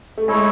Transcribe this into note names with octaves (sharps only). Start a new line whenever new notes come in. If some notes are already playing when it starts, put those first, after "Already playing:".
A3
G#3 E4 A4 C#5